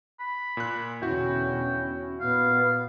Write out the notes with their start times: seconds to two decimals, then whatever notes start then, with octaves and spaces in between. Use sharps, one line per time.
0.20 B5
0.57 A#2 F#6
1.02 E2 B2 D3 C#4 E4 F#4 G5
2.20 A#2 B3 F5